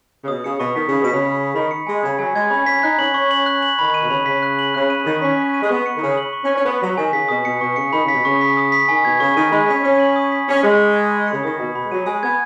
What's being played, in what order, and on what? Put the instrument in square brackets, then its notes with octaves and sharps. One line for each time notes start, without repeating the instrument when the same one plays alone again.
[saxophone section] C#3
[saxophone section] B2 [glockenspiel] D#6
[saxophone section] C#3 [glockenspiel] C#7
[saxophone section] B2 [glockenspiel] C#6
[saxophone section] D#3 [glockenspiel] B6
[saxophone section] C#3 [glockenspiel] B5
[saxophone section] B2
[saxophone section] C#3 [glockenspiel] B6
[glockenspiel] B5
B6
[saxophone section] D#3 [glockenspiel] B5
[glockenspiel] C#7
[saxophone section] G#3 [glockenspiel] G#5
[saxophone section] C#3 [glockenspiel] G#6
[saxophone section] F#3 [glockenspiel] G#5
[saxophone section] G#3 [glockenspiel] G#6
[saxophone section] C#4 [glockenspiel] B5
[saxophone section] C#4 [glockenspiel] B6
[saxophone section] D#4 [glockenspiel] F#6
[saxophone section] C#4 [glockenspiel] F#7
[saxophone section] C#4 [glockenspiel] C#6
[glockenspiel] F#7
F#6
F#7
[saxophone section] D#3 [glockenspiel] B5
[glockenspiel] D#7
[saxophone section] B2
[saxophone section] C#3 [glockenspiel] B5
[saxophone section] C#3 [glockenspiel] B6
[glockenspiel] F#6
F#7
[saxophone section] C#3 [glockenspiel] F#6
[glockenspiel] D#7
[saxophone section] D#3 [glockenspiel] D#6
[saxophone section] C#4 [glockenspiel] B6
[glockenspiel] B5
D#7
[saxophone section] G#3
[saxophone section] B3 [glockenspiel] C#6
[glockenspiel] C#7
[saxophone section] D#3
[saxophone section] C#3 [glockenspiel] C#6
[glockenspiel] F#7
C#6
[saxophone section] C#4
[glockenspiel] D#7
[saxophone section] C#4
[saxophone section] B3 [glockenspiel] C#6
[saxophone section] F#3 [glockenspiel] B6
[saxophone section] D#3 [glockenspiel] G#5
[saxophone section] C#3 [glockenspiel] B6
[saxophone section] B2 [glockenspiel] D#6
[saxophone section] B2 [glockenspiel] C#7
[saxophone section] B2 [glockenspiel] C#6
[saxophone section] C#3 [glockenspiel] C#7
[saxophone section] D#3 [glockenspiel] B5
[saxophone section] C#3 [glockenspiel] B6
[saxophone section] B2
[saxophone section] C#3 [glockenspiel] C#6
[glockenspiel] B6
D#6
B6
[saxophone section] D#3 [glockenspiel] G#5
[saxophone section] B2 [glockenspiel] G#6
[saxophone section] C#3 [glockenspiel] C#6
[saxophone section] D#3 [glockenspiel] D#7
[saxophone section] G#3 [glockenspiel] B5
[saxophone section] C#4 [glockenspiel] B6
[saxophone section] C#4 [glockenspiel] C#6
[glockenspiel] F#7
D#6
B6
[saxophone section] C#4 [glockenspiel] B5
[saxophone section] G#3 [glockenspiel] C#7
[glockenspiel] G#5
G#6
B5
C#7
[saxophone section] C#3
[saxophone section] D#3 [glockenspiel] D#6
[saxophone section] B2 [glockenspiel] C#7
[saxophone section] B2 [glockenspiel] B5
[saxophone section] G#3
[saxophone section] F#3 [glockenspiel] D#7
[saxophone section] G#3 [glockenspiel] G#5
[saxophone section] B3 [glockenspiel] G#6